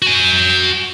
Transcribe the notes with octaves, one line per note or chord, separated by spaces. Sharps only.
F#4 G#5